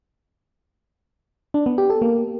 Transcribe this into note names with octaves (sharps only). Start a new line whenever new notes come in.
D4
B3
G4
A4
A#3